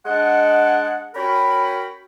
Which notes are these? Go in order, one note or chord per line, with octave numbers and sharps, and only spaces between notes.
G#3 D4 D#5 F#5
C#4 F#4 A#4 G5 B5